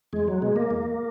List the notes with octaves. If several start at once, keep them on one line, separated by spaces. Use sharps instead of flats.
E2 G#3
F#3
B2 G#3
A#3
E2